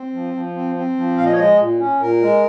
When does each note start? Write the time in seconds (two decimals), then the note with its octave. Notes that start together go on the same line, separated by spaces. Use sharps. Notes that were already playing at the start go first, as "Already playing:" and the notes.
Already playing: C4
0.13 F3
0.34 F3
0.56 C4
0.76 C4
0.97 F3
1.17 A#2 F5
1.25 D#5
1.32 C#5
1.38 G#3 D#5
1.59 A#2
1.80 C#4
2.00 A#2 A#4
2.22 G#3